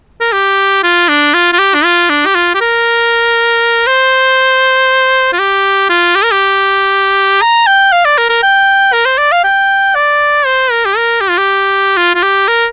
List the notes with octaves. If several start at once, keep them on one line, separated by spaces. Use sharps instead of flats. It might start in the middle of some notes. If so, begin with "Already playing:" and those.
A#4
G4
F4
D4
F4
F4
G4
D4
F4
D4
G4
F4
G4
A#4
C5
F4
G4
F4
G4
A#4
G4
A#5
G5
F5
D5
A#4
A#4
G5
A#4
C5
D5
F5
G5
D5
C5
A#4
G4
A#4
G4
F4
G4
F4
F4
G4
A#4